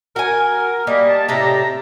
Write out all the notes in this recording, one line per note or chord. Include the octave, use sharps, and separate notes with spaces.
F#4 A#4 G#5
G3 A#3 D#5
A5
A2 C3 G4 E5 A#5